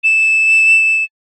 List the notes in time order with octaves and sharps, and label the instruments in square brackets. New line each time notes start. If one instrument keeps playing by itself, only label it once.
[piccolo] E7